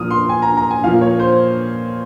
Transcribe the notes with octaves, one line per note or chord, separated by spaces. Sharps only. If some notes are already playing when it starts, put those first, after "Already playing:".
Already playing: A#2 F3 D#6 F6
C6
G#5
A#5
A#5
G#5
A#2 F3 F5
C#5
C5